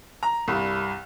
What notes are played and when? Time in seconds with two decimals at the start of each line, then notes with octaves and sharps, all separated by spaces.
0.23 A#5
0.48 C2 G2